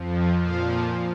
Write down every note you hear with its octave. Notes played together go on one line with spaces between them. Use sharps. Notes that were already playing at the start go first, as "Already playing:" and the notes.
Already playing: F2 F3
A#2 F3 F5